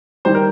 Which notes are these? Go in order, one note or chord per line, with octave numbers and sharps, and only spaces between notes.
D#3 G3 C5
A#4